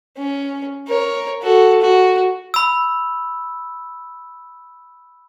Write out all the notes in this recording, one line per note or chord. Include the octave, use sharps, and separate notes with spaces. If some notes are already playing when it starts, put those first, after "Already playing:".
C#4
A#4 C#5
F#4 A4
F#4
B5 E6